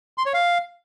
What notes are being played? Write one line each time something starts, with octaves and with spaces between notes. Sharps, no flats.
C6
C#5
F5